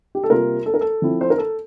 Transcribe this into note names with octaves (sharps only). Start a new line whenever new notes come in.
G4
A4
C3 G3 A#3 F4 A#4
A4
A#4
A4
F3 C4 E4
C5
A#4
A4